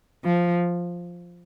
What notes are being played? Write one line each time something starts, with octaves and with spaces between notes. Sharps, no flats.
F3